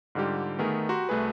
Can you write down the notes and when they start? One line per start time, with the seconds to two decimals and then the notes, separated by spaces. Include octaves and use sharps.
0.15 G#2 D3 G3 F4 G4
0.59 D#3 A3 B3 G#4 A#4
0.89 F#4 G4 A#5 C6
1.09 C2 A3 F#4 G#4 B4